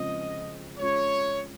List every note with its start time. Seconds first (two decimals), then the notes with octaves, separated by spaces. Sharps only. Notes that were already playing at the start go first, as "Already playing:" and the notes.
Already playing: C#3 F3 G#3 C4 F4 D#5
0.79 G#3 C#4 F4 C#5